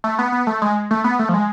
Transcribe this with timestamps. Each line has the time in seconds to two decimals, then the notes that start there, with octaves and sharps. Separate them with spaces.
0.04 A3
0.19 B3
0.32 B3
0.47 A3
0.62 G#3
0.91 A3
1.04 B3
1.19 A3
1.29 F3
1.34 G#3